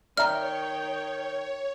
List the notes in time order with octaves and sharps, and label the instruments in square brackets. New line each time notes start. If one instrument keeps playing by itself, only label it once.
[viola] D#3 G5 [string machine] C#5 [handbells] D5 E5 A#5 [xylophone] F6